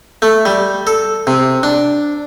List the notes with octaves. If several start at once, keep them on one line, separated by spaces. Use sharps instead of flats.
A3
G3
A4
C3
D4